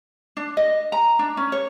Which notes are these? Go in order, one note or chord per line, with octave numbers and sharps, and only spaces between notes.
D4
D#5
A#5
D4
C#4
C#5